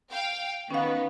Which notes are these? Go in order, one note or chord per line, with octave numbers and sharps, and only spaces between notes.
F5 G5
D#3 B3 C#4 F5